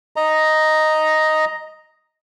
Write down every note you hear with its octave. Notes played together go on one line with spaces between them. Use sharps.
D#5 A#5